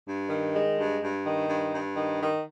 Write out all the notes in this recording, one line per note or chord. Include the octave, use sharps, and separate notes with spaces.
G2
D#3
G#3
G2
G2
D#3
G2
G2
D#3
D#3